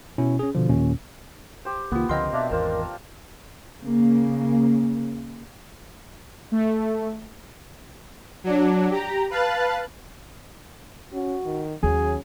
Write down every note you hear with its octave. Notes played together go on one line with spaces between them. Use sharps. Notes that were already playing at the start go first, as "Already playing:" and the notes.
B2 C#4 E4
C#4 G#4
B2 D3 F3
D#2 A#2 C#4
G4 C5
C2 D#3 A#3 B3 F4
C#2 D3 F3 C4 F4 A#4 D#5 C6
B2 A#3 D4 E5 F5
G#1 E2 F4 A#4 C5
C#3 A#3
A3
F#3 D4
G4 A#5
B4 F5 A5 F#6 A6
C#4 F#4
D#3
D#2 D#3 F#3 C#4 G#4